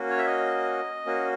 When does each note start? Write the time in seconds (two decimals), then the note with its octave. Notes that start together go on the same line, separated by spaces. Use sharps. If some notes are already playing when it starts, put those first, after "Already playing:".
Already playing: A#3 C#4 F#4
0.10 C#5
0.18 E5
0.26 D#5
1.06 A#3 C#4 F#4